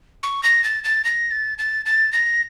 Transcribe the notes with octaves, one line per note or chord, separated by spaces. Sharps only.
C#6
A#6
A6
A6
A#6
A6
A6
A6
A#6